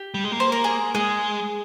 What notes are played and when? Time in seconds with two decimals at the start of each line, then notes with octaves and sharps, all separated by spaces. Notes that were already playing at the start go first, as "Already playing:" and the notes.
Already playing: G4
0.14 G3
0.24 G#3
0.32 A#3
0.40 C5
0.52 A#4
0.64 G#4
0.95 G#3 G#4